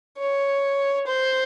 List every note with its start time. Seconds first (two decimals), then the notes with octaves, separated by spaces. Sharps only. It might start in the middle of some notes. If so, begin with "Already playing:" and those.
0.18 C#5
1.07 C5